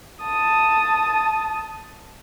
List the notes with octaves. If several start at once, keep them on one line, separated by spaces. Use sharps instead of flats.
A5 D#6